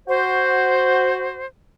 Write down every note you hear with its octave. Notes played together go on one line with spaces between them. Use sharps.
F#4 C5